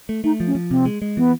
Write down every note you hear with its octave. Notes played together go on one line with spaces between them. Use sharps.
A3
A3 D#4
F3
C#4
F3
C3 C4
G#3
G#3
E3 B3